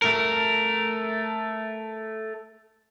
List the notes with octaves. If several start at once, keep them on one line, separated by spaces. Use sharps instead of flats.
A3 A#4